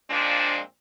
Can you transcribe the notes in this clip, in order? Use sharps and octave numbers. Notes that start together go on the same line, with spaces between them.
A#2 F3 G#3 C4 D4